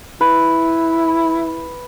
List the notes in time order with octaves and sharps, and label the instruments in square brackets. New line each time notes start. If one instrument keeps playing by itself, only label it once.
[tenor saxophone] E4 [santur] B4